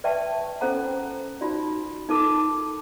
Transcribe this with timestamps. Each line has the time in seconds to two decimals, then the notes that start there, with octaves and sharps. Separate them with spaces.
0.04 B4 D5 E5 G5 A5 C#6
0.61 C#4 F4 A4 C5 F#5 A#5
1.41 D#4 F4 F#4 D5
2.09 D#4 F4 A4 A#4 A5 D6